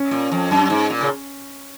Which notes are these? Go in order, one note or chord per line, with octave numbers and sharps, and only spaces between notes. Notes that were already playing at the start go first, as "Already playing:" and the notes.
Already playing: C#4
A#2
F2
F#2
G#2
A#2
C#3